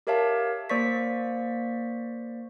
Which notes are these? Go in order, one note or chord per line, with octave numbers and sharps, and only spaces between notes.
G4 A#4 C#5 E5 F5 A5
A#3 C5 D5 C#6 B6